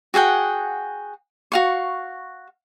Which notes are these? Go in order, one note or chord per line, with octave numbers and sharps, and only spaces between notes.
F#4 G#4 F#5 G5
F#4 F5 C#6